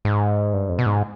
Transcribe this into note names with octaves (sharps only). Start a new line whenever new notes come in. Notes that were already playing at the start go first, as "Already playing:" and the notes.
G#2
G2
F2
B2
G#2